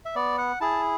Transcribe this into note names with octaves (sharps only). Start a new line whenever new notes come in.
E5
B3 D5
F#5
E4 G#4 A5